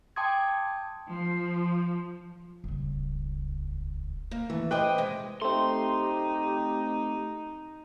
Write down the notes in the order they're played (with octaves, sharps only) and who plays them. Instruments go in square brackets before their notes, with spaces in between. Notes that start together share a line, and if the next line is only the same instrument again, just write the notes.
[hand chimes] G5 A5 C6 D6 D#6 G#6
[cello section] F3
[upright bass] D#1 C#2
[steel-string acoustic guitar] A#3
[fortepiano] E3 [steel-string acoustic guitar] A3
[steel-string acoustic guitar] B4 C5 D#5 [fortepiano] G5 D6 F#6
[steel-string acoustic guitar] C3 D#3 G#3
[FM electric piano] A3 C4 [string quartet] D#4 [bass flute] G4 [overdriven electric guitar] C6